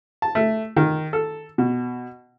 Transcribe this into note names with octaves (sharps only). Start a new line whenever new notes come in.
A5
A3
D#3
A4
B2